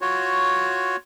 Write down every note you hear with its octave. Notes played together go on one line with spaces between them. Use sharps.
F4 F#4 C#5